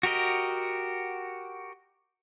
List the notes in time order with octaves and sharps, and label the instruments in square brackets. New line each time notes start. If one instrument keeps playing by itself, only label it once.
[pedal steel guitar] F#4 G4 A#4 D#5